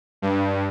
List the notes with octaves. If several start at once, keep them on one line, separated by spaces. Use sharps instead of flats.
G2